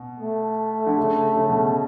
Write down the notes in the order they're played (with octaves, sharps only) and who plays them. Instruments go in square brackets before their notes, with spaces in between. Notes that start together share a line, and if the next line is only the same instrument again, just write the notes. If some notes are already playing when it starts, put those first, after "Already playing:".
Already playing: [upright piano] B2
[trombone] A3
[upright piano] D3
C#3
C#3
B2